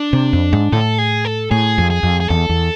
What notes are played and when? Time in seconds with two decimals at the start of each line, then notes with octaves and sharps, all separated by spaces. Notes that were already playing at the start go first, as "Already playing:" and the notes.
Already playing: D4
0.13 C3
0.33 F2
0.53 G#2
0.72 A2 A4
0.98 G#4
1.25 A4
1.51 A2 G#4
1.78 F2
1.90 G#4
2.03 F2
2.20 G#4
2.29 E2 A4
2.49 E2